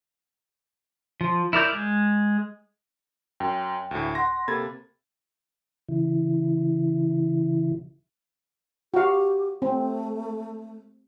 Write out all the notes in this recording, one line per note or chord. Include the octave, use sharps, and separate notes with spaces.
F3
E4 A#4 D5 G6
G#3
F#2 G5
D2 A2
F#5 C6 A#6
C3 A#3 A4 B5 G#6 A6
C#3 E3 E4
F#4 G4 F5
A3 C4